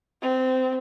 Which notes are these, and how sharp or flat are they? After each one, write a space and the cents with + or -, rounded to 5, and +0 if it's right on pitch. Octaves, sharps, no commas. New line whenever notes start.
C4 -20